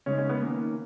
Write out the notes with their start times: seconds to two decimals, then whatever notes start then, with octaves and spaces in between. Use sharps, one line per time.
0.06 C#3 G#3 C#4 D#4
0.18 C#4
0.29 B3
0.40 D#3 A#3 C#4